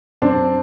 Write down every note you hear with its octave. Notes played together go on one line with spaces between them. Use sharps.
F#2 C4 D4